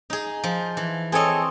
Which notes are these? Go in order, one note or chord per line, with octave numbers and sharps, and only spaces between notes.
D#4 G#4
F3
E3
C4 G#4 A4 C#5 D#5